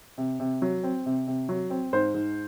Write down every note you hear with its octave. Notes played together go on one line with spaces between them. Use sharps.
C3
C3
F#3
C4
C3
C3
F#3
C4
G#2 C5
G#2